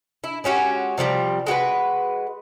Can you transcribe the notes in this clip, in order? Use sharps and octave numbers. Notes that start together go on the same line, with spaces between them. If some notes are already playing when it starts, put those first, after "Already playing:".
E4
G#3 C#4 F#4 G4
C3 F3 G3 C4
G#3 F#4 G4 B4